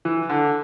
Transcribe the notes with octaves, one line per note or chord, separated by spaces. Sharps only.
E3
D3